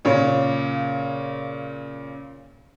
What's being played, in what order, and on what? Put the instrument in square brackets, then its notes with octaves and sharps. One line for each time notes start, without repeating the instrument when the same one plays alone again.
[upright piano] A#2 C#3 C#5